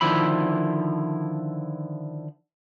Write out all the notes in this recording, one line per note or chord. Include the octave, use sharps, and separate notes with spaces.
D3 D#3 F3 E4 E5 B5